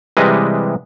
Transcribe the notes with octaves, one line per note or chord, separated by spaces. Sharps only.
C3 E3 G3 G#3 B4 D#5